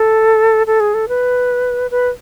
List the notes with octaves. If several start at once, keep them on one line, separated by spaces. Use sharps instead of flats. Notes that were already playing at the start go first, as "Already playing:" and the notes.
Already playing: A4
A4
G#4
A4
B4
B4